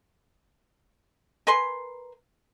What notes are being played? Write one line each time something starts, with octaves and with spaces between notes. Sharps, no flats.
A#4 B4 G#5 C6